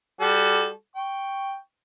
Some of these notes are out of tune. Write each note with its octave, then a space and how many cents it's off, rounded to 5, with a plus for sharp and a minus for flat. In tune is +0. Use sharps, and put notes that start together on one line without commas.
G3 +10 F#4 +0 A4 -25
G5 +0 C#6 +0